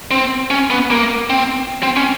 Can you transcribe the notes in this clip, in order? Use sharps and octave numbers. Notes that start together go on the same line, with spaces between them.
C4
C#4
B3
A#3
C4
C4
C#4